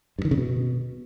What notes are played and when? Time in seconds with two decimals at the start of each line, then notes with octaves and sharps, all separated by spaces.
0.19 G2
0.25 D#3
0.31 C#3
0.38 B2